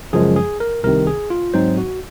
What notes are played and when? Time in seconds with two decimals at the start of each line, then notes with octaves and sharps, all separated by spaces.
0.13 F#2 C#3 F3 G#3 G#4
0.36 G#4
0.60 A#4
0.84 C2 C3 D#3 A#4
1.07 G#4
1.30 F4
1.54 G#2 F#3 C4 D#4 C5
1.77 F#4